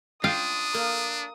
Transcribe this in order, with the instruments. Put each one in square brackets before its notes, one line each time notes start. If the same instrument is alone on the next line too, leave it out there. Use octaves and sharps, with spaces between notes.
[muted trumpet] D4 [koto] F4 F5 G5 [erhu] D#6
[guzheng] A#3 A#5